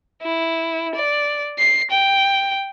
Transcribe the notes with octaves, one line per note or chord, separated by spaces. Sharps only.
E4
D5
C7
G5